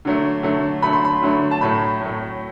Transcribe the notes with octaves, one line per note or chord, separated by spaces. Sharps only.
D3 F#3 A3
D3 F#3 A3
D3 F#3 A3 B5
C6
B5
D3 F#3 A3
A5
A2 F#3 A3 B5
A2 F#3 A3